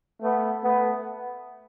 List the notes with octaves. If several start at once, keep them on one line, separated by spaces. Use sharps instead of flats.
A3 B3
A3 B3